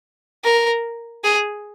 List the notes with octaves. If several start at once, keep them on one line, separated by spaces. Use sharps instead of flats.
A#4
G#4